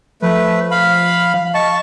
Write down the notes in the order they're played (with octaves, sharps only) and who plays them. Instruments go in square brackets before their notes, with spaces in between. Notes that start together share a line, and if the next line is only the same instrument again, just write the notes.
[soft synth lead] F3 [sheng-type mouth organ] A3 B4
[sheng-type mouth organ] F5 B5
[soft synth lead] F5
[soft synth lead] D#5 [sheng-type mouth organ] A5 C#6